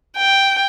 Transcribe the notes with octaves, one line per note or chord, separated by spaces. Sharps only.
G5